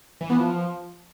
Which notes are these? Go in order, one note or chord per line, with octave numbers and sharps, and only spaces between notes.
E3
B3
F3